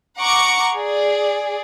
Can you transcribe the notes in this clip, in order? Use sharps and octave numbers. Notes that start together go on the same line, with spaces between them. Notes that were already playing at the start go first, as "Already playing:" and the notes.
F#5 A#5 C#6 D6 C#7
G#4 D5